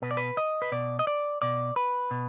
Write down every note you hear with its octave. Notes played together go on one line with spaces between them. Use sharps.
B2 B4
D5
B4
D#5
B4
B2 D5
D#5
D5
B2 D5
B4
B2